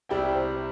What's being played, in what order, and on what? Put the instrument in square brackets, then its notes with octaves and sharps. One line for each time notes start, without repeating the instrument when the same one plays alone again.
[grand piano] C2 C3 G3 E4 [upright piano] D5 G5
[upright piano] C5 E5